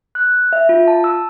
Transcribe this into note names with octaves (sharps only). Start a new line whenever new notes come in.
F#6
E5
F4
A5
E6